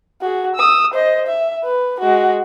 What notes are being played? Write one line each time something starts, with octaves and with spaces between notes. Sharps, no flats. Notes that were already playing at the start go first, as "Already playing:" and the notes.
F#4 G#4
D#6 E6
C5 D#5
E5
B4
G#3 F#4